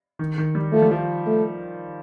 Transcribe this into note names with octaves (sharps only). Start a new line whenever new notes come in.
D#3
D#3
G3
F3 A3
G3
F3
A3